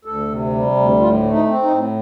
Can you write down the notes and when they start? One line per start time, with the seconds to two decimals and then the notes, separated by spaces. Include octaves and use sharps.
0.05 D2 A4
0.28 C3
0.53 G3
0.76 D2
0.99 A2 F4
1.23 A3
1.31 D#4
1.48 C4
1.63 D#4
1.71 A2